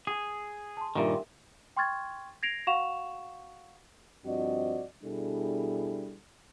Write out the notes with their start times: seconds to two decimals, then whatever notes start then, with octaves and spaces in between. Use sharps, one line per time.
0.07 G#4
0.77 A5 C6
0.95 G2 A#2 D#3 G4 A#4 E5
1.77 G5 C6 C#6 F6 G#6 A6
2.43 G#6 A#6 C7 D7 F7
2.67 F#4 F5 F#5 C#6 E7 F7
4.26 G2 F3 C4 F#4 D5 D#5
5.04 B2 G3 D4 E4 G#4 A4